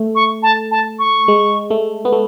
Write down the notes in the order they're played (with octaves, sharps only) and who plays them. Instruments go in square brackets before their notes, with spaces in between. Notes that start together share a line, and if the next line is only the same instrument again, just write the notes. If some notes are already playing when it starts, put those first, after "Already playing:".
Already playing: [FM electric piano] A3
[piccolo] C#6
A5
A5
C#6
[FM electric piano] G#3
A3
B3
A3